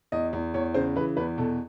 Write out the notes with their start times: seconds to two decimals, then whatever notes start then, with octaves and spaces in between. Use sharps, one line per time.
0.12 E2 D#5
0.33 E2
0.54 E2 C#5
0.74 C#3 C5
0.96 E3 B4
1.17 E2 B4
1.38 B2 A4